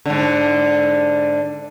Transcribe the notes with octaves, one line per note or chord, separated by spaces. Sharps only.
G#2 D3